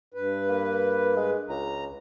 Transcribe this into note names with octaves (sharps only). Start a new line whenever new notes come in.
G2 B4
A#3
G#3
C#2 A#5